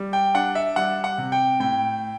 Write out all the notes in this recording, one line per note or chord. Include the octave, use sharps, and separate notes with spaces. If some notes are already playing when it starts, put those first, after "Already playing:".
Already playing: G3
G5
D4 F#5
E5
G3 F#5
F#5
C3
G5
A2 G5